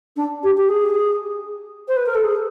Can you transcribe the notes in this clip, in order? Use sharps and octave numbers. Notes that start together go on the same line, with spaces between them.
D4
G4
G4
G#4
C5
B4
A#4
A4
G#4